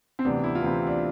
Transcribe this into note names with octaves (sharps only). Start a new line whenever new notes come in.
C4
D2 C3 E3 B3 D4
E4
F4
D2 C3 E3 C4 E4
D4